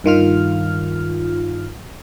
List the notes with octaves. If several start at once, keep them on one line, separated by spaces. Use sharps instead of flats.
G2 D#3 F4 F6